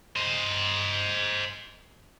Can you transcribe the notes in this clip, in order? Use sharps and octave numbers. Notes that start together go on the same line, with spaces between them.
C5 D#5